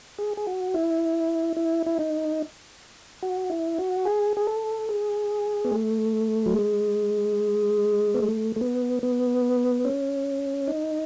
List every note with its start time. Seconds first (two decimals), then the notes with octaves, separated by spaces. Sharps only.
0.18 G#4
0.37 G#4
0.47 F#4
0.74 E4
1.56 E4
1.86 E4
1.99 D#4
3.22 F#4
3.50 E4
3.78 F#4
4.05 G#4
4.37 G#4
4.47 A4
4.89 G#4
5.65 B3
5.72 A3
6.46 F#3
6.54 G#3
8.14 B3
8.20 A3
8.56 A3
8.61 B3
9.03 B3
9.85 C#4
10.67 D#4